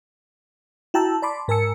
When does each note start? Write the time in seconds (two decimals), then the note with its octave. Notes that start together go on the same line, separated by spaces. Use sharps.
0.94 E4 F#4 G5 A5 A#5 E6
1.22 D5 A5 B5 C6 D6
1.48 G#2 A#4 G#5 A5 E6 C#7